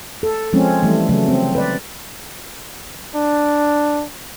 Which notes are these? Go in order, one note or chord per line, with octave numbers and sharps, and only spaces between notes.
A4
F3 G#3 C4 C#4
E3 G3 A3
C#3 F#3 A3
C4
B4 D5
D4